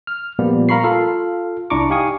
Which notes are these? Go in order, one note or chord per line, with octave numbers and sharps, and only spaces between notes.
F6
A#2 F3 G3 A#3 B3
A#4 F5 A#5 B5 C#6 C7
F4 A4 F5
C2 D4 E4 A#5 C#6 D6
D#4 G4 F5 G#5 C#6 D#6